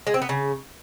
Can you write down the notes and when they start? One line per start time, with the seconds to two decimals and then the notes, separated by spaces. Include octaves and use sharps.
0.07 G#3
0.14 C4
0.22 B3
0.29 C#3